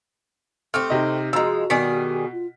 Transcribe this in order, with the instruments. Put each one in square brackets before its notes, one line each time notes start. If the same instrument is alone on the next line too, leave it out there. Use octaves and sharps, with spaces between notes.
[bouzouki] A3 C4 G4 [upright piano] F6
[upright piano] C3 D#4 D#5
[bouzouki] F3 G#3 [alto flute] F#4 [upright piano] A#5 E6
[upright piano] B2 B6 [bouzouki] D#3 G3 G#4
[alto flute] F4